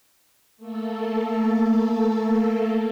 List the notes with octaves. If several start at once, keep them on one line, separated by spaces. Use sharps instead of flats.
A3 A#3 A4